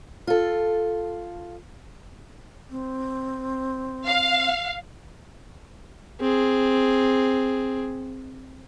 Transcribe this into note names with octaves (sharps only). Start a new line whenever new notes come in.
F4 A4
C4
F5
C4 G#4